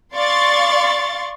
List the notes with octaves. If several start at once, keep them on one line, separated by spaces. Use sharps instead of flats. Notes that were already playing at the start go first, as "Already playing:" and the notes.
D5 F5 C6 C#6 A6